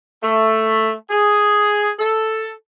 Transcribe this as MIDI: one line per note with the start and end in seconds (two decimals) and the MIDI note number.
0.23 0.92 57
1.11 1.91 68
1.99 2.50 69